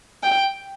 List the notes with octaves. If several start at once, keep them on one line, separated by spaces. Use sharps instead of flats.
G5